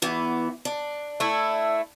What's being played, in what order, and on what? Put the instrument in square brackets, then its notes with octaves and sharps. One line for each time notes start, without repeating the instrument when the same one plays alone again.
[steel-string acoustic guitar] E2 E3 B3
D4
[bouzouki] A3 E4